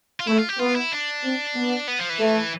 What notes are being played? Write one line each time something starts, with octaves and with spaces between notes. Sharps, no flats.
F4
A3 E4
F4
G4
B3 F4
E4
D4
C4
B3
B3
F3
E3
A3